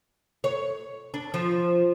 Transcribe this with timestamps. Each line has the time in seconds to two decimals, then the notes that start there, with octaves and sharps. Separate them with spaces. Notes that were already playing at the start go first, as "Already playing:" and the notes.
0.44 C#5
1.14 D4
1.34 F3